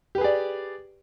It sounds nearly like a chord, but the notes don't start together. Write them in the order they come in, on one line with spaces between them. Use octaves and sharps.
G4 B4 G#4 D5